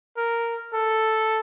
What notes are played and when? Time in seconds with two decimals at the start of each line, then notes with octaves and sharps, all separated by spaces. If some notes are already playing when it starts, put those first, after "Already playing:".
0.17 A#4
0.74 A4